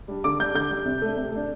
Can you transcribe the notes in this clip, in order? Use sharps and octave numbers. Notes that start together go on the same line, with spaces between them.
G3 D4
D3 D6
G3 D4 G6
D3 G6
G3 D4
C3
A3 D4
C3
A3 D4